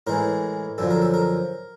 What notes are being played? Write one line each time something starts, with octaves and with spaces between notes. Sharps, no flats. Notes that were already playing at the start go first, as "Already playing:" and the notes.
A2 E3 G#3 A#4
F#2 D3 F3 A4
A#4
A4
A#4